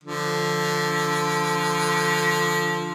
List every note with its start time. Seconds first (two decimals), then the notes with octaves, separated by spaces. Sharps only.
0.04 D3 F3